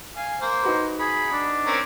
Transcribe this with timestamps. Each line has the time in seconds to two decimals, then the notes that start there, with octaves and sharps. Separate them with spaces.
0.16 F5 G#5
0.41 A#3 C5
0.63 D#4 F#4 B4
1.00 G#4 B5
1.32 D4
1.66 C4 C#4 A#4